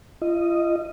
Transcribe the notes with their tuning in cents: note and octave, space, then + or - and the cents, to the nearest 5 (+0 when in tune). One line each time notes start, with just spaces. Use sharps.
F4 -40 D#5 +0